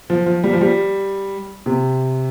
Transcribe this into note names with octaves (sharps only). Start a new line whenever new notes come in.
F3
F3
G3
F3
G3
C3